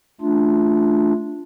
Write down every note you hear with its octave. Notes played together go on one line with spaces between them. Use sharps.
A3 D4 F4